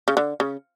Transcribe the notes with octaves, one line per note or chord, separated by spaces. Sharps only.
C#3
D3
C#3